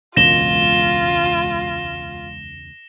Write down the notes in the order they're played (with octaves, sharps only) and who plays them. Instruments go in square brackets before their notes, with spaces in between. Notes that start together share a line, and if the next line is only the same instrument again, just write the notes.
[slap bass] E1 C#2 F#2 [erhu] F4 [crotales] A#6 E7 G7